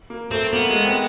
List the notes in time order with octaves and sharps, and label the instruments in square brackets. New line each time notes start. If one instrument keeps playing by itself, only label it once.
[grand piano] A#3
[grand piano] A3 [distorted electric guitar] C4
[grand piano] A#3 [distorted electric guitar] B3
[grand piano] G#3
C4